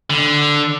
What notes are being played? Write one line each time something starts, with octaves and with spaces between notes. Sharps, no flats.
D3